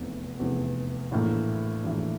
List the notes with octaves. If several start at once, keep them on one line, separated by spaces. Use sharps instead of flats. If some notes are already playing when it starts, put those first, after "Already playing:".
Already playing: F1 E2 C3
F1 E2 C3
A#1 A2 E3 A#3
A#1 A2 E3 A#3